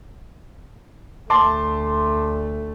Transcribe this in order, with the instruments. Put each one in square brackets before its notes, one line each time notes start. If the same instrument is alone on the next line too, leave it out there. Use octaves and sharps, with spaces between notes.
[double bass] D2 A3 [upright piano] A5 C6 D6